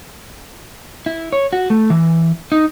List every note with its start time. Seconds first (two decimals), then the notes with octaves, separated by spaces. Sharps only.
1.06 E4
1.33 C#5
1.53 F#4
1.70 A3
1.90 E3
2.52 D#4